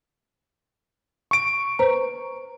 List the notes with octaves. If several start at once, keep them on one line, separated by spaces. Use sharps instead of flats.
C#6 D7
B4 C5 A#5